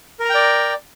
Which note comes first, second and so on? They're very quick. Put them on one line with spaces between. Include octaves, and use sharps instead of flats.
A#4 A#5 G5 D5